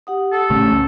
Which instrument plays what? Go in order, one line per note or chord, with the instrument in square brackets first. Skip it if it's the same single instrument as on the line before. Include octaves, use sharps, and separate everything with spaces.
[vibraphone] G4 F#5 D#6
[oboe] A4
[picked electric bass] A1 C#3 A3 [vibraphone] C#4
[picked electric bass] C#2